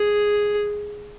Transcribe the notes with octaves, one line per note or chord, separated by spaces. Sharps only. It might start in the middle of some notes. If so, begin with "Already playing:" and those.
Already playing: G#4